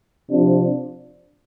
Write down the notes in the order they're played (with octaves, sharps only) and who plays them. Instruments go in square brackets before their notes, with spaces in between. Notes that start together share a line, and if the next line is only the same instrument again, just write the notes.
[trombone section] C3 F3 D4 F4